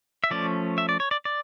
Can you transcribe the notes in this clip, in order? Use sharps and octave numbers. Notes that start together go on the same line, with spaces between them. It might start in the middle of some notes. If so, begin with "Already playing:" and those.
E5
F3 A3 C#4 D5
E5
D5
C#5
D5
D5